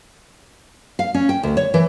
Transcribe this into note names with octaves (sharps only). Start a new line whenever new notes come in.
F5
C#4
G5
D2
C#5
E3